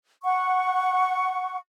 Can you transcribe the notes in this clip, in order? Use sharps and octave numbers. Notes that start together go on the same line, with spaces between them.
F#5 C#6